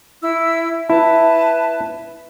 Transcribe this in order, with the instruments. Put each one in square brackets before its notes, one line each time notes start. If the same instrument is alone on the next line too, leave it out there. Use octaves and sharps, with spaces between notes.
[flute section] E4 E6
[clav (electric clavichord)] E4 [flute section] B4 A5